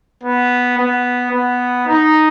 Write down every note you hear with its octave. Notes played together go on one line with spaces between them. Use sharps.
B3
B3
B3
D#4